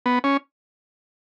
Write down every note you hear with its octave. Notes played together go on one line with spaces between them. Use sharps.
B3
C#4